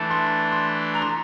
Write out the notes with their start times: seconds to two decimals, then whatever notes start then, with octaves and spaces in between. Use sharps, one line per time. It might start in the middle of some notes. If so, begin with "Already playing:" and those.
Already playing: E3 A3 D4 A4
0.10 C6
0.52 C6
0.94 A#5
1.02 C6